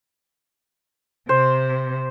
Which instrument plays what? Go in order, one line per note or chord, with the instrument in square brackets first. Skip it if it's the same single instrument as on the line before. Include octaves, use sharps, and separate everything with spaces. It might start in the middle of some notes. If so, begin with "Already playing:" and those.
[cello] C3 [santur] C5